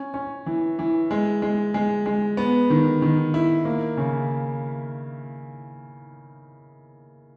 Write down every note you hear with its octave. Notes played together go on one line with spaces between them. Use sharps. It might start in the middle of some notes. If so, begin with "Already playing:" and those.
Already playing: C#4
C#4
E3
E3
G#3
G#3
G#3
G#3
B3
D#3
D#3
E4
A#3
C#3